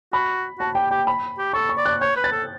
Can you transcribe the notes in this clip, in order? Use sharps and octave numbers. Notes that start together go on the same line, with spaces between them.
F#4 B5
F#4 A5
G4 G5
G4 G5
B5
G4
A4 C#6
C#6
D5
F#6
C#5 G6
B4
A6
A4